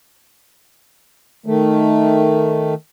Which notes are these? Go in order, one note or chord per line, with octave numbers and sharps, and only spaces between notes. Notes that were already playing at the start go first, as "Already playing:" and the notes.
D#3 A3